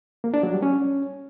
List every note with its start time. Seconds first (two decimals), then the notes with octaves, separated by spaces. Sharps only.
0.24 A#3
0.34 D4
0.43 F#3
0.53 G3
0.63 C#4